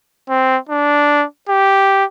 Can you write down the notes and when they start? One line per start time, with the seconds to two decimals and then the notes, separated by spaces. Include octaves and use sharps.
0.29 C4
0.69 D4
1.49 G4